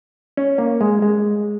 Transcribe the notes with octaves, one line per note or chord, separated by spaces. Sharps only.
C#4
A#3
G#3
G#3